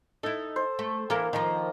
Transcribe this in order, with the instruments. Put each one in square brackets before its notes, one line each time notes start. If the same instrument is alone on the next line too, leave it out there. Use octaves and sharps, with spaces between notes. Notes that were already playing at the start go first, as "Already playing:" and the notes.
[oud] D#4 E4 [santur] A4
[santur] C5
[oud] A3
[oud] E3 A4 A#4 [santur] A#3
[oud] D#3 F3 [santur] D#4 A#5